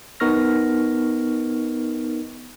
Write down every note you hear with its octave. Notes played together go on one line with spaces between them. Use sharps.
B3 D#4 A#4 C#6 F6 A#6